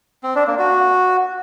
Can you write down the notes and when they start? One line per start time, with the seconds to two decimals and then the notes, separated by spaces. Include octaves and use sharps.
0.23 C4
0.35 D4
0.47 A#3
0.59 F#4